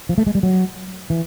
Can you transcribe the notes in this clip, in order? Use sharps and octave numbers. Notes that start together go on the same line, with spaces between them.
F3
A3
G#3
G3
F#3
E3